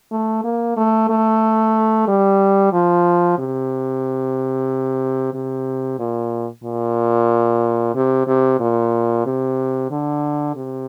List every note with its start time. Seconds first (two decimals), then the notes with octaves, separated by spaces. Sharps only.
0.12 A3
0.44 A#3
0.77 A3
1.10 A3
2.08 G3
2.73 F3
3.39 C3
5.34 C3
5.99 A#2
6.64 A#2
7.95 C3
8.27 C3
8.60 A#2
9.26 C3
9.91 D3
10.56 C3